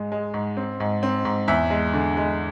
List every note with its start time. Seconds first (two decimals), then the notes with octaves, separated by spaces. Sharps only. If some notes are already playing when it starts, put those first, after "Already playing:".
Already playing: G#2 G#3
0.12 G#3
0.34 G#2
0.57 C4
0.80 G#2
1.03 C4
1.25 G#2
1.48 E2 E5
1.70 G#3
1.93 D3
2.17 G#3